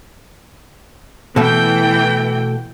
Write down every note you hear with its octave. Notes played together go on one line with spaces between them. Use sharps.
B2 E3 A3 G5